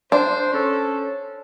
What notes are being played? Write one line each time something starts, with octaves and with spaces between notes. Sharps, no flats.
D4 C5
C#4 A4